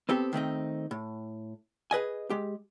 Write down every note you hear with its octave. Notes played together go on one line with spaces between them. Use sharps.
B3 C4 G4 A4
D#3 A3 C4 D#4
A2
G#4 B4 D#5 G#5
G#3 G4